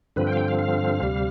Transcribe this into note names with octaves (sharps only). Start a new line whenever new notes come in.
G2 D3 F3 C4 B4
G5
F5
G5
F5
F5
D2 C3 G3